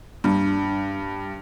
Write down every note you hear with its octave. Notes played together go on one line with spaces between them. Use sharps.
G2